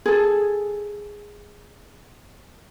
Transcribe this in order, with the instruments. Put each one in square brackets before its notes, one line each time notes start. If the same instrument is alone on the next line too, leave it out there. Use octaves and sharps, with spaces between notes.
[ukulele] G#4 A4